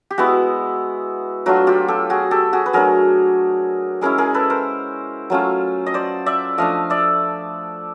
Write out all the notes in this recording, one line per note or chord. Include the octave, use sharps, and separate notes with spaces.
G4
G#3 B3 E4 F#4
F#3 A3 D4 F4 F#4
F4 G4
G4 A4
F#4 G#4
G4 A4
F#4 G#4
B4
F#3 A3 D4 G#4 A#4
G#3 C#4 E4 G#4 A#4
G#4 A#4
A4 B4
A#4 C5
F#3 A3 C#4 F4
D#5
C5 D5
D5 E5
F3 A3 D4 D#5 F5
D5 E5